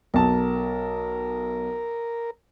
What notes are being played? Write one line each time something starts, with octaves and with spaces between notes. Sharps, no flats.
B1 A#4 A5